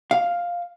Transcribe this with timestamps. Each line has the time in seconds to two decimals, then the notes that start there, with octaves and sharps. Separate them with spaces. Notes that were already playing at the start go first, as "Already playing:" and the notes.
0.11 F5